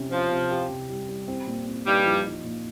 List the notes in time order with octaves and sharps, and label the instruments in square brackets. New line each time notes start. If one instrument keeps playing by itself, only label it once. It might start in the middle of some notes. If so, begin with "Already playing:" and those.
Already playing: [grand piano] C3 C#4
[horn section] F3 [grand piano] C#4
[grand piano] C3
G4
C3
G3
G3
C4
A#2
C4
[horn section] G2 G3 [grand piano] D#4
[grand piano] F3
D#4
A#2